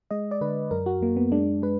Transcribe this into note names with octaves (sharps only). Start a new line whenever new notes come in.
G#3 D#5
D5
D3 B4
F#2 A#4
F#4
F#2 A#3
B3
G#3 D4
G#3 B4